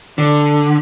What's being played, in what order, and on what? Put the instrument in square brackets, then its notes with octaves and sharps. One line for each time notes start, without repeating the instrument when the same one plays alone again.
[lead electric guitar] D3